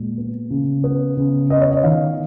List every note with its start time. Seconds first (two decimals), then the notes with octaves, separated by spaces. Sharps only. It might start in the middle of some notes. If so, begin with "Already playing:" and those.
Already playing: A#2 G#3
0.18 B3
0.50 C#3
0.84 B3
1.17 C#3
1.50 B3 D#5
1.61 C#5
1.71 D#5
1.83 D#3 F5